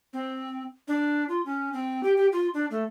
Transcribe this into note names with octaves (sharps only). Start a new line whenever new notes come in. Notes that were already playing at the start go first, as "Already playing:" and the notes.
C4
D4
F4
C#4
C4
G4
G4
F4
D4
A3